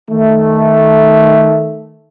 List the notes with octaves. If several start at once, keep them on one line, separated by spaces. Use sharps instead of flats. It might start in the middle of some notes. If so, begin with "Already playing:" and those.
D#3 A3